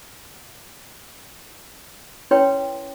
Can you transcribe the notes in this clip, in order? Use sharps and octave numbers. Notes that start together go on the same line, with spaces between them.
C#4 E4 B4 C#5 G5 C6